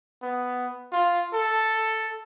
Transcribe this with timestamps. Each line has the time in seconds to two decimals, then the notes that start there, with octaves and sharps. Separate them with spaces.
0.22 B3
0.92 F4
1.34 A4